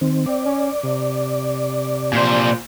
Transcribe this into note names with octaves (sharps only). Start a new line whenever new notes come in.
D#3 C4
C4 D5
C#4
C3
A#2 C5